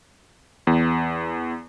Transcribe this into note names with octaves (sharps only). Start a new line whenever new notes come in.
E2